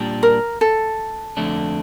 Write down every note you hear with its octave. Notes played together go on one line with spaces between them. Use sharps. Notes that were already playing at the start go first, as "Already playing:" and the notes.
Already playing: A#2 G3 D4
A#4
A4
F2 D3 A3 D4